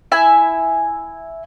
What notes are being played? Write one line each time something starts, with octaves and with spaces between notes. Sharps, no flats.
E4 E5 G#5